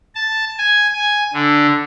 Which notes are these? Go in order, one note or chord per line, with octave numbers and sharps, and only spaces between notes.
A5
G#5
G#5
D3